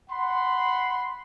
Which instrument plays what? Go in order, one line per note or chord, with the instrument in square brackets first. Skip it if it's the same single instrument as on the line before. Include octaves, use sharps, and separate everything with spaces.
[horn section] F#5 B5 C6